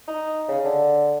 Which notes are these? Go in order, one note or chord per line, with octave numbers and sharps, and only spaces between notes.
D#4
C#3
D3